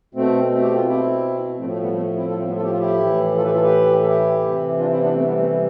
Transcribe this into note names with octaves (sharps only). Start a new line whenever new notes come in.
B2 A3 C4
A3 C4
G4
F4
C4 E4
A2 F3 A3 C4
A3
G3 B3
A3
C4 E4
F4 A4
A3 C4
G3 B3
F4 A4
G4
F4
E4 G4
A2 E3
F4 A4
G4 B4
F4 A4
G4 B4
A4
E4 G4
C3 E3
D4 F4
C4 E4
B3 D4
A3 C4
G3 B3
A3
G3